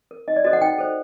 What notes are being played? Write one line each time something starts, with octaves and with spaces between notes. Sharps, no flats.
A#4
D#4 D#5
D5
F#4 A4 C5 D#5
F#5
D#4 G5
A4 C5